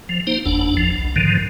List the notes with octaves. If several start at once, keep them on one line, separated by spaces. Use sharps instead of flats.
F3
A#3 D#4 C5
F#1 E2 D4
F3
B1
G#2 D3 D#3 F3